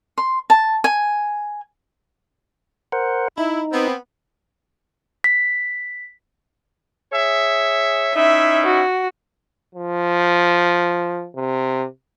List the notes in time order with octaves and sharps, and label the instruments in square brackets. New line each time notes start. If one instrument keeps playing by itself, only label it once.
[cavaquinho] C6
A5
G#5
[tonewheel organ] A#4 C5 F#5
[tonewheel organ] D#4 [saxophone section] E4
[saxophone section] B3 C4
[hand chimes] B6
[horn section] G#4 C#5 E5
[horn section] C#4 D#4 E4 [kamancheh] E5
[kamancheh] F#4
[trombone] F3
C3